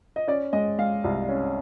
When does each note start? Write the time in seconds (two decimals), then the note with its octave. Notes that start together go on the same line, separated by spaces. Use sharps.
0.16 D#5
0.27 C#4 D5
0.53 G#3 D#5
0.78 G#3 F5
1.04 C2
1.29 C#4